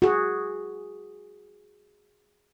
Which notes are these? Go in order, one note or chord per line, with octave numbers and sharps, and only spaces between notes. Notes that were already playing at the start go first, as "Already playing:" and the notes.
F#4 G#4